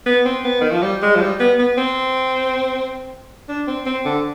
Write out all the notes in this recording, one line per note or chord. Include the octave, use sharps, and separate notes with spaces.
B3
C4
B3
D#3
F3
G3
G#3
F3
G3
B3
B3
C4
D4
C4
C4
D3